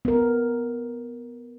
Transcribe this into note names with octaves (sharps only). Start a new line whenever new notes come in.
B3 A#4